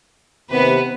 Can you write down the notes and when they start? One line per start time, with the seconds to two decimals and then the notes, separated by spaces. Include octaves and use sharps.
0.50 D#2 C3 B3 B4